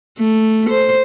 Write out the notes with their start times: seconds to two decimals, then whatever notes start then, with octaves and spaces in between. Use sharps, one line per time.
0.19 A3
0.70 C5